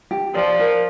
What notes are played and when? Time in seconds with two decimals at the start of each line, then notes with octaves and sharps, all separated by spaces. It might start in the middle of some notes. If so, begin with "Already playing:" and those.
0.11 G4
0.35 F3 D5
0.60 A#4